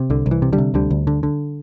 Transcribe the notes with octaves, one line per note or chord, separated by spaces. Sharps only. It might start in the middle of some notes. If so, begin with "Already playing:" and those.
Already playing: C3
C2 D3
C2
E3
C3
D3 G3
C3
D2 D3 G3
D2
D3
D3